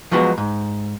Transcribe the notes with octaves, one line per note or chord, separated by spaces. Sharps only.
F3 F#3 G#3 B3 F#4
G#2